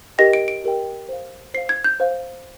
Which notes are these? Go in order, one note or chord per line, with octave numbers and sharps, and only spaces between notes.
G4 A#4 D#5 G5 A#6
D7
D7
G4 A#4 D#5 G5
C5 F5
C5 F5 C7
G#6
G6
C5 F5